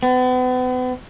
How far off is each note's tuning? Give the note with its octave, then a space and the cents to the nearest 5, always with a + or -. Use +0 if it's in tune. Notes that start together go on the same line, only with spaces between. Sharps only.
B3 +40